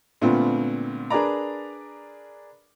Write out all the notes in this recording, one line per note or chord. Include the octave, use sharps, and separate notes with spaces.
A#2 D3 A3 B3 C4 F4
D4 G#4 A#4 B4 D5 A#5